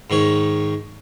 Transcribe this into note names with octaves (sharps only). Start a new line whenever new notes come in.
G#2 D#3 C#5